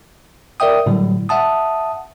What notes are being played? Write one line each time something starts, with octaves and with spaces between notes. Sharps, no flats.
A#4 D5 E5 G5 D#6
A2 D3 F#3 G3
E5 F#5 A5 D#6